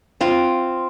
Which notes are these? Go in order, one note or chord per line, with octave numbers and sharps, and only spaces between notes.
C4 F4